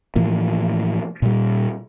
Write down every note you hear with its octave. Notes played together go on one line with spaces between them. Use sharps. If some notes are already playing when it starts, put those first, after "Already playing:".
A2 E3 F3 A#3
A#2 G3